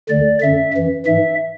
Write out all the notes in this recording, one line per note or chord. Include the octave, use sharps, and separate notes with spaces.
D2 D3 D5
F#2 D3 E5
F#2 E3
G#2 E3 E5